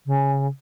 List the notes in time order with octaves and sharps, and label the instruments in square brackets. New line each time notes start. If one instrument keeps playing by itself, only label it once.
[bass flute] C#3